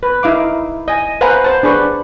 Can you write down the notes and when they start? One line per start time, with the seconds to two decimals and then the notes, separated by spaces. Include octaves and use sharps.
0.03 B4
0.23 D#4 E4 F5 D6
0.88 D#5 G#5
1.21 B4 C5 F5 F#5 G#5 A#5
1.44 C5 A5
1.63 D4 G#4 B4 C#6